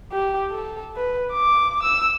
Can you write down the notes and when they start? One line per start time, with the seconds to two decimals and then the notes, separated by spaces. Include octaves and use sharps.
0.12 G4
0.51 A4
0.96 B4
1.32 D6
1.83 E6